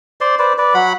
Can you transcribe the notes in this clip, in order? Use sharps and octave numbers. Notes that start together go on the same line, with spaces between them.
C5 D5 C6
B4 C5 D5
B4 D5
F#3 F#5 B5